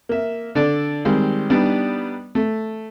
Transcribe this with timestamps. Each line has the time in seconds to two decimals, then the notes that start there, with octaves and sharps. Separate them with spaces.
0.09 A#3 E5
0.55 D3 A4 D5
1.05 D#3 G3 G#3 C4
1.50 G3 B3 D4 D#4 D5
2.35 A3